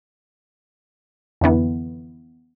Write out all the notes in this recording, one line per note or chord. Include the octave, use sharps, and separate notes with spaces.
F2 D3 E3 B3